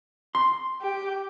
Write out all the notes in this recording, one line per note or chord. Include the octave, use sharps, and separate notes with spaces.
C6
G4